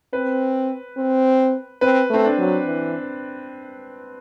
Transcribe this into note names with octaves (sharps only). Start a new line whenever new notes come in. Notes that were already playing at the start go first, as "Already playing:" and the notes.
C4 B4
C4
C4 B4
A3 C4
D4
F#3
E3